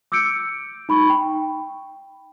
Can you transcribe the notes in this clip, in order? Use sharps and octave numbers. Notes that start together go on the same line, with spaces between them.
D6 E6 G6 C#7 D7
D#4 B5 C#6
G5